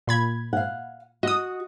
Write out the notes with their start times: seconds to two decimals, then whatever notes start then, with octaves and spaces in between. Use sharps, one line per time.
0.07 A#2 B5 G#6
0.53 F5 F#5
1.23 F#4 D#5 D#6